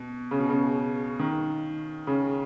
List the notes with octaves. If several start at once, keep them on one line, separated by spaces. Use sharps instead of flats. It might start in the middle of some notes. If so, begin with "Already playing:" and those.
Already playing: B2
C#3
B2
C#3
D#3
C#3